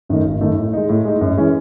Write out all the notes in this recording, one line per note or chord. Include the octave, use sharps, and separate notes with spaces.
F#2 D#3 A3 D#4
G#1
F#2 D#3 A3 D#4
A2
G#3 D#4
A2
G#3 D#4
F#2
E3 G#3 C#4